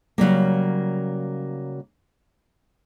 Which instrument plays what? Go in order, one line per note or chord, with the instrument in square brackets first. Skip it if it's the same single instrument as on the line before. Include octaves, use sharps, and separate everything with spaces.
[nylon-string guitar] C#3 F#3 G3 A#3